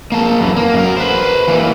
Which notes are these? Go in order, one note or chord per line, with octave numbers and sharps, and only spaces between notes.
A#3 A5
F#2 E3
A#3
F#2 A#4
B4 C5
E3 A#3